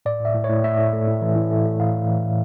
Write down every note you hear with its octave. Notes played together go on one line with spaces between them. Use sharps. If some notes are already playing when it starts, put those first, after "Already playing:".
A2 D5
A2 E5
A2
C#5
A2
A3 E5
A2
A3
A2
E3
A2
A3
A3
A3 F5
E3
E3
A3